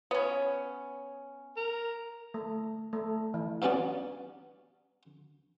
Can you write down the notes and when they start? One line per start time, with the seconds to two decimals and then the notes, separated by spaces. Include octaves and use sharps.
0.11 B3 C#4 C#5
1.57 A#4
2.34 A3
2.93 A3
3.34 E3
3.62 G2 F#3 B3 C#4 D5